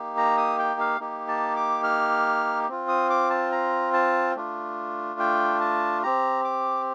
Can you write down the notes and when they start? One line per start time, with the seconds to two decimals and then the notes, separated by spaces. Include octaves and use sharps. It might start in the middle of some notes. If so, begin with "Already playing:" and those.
Already playing: A#3 D#4 G4
0.17 A#5
0.37 D#6
0.59 G5
0.80 F5
1.00 A#3 D#4 G4
1.28 A5
1.56 D6
1.84 F6
2.68 C4 F4
2.88 D#6
3.10 D6
3.30 A5
3.52 A#5
3.93 A5
4.35 A3 D4 F4
5.20 G5
5.61 A5
6.03 C4 G4 A#5
6.44 D6